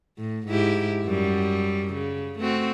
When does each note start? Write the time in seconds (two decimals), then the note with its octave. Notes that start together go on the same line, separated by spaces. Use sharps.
0.18 A2
0.48 G#2 E4 G4
1.05 F#2 G3
1.93 C#3
2.39 A3 C4 F#4